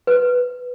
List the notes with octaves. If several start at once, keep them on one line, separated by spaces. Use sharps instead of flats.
B4